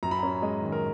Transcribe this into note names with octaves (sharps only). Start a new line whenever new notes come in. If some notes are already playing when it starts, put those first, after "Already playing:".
F#2 A#5
B5
C#4 A#5
G#3 D#5
D#3
A#4